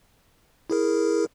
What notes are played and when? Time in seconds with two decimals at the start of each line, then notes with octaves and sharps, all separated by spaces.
0.70 E4 G#4 A#4